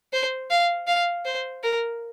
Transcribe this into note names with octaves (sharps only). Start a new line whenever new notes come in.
C5
F5
F5
C5
A#4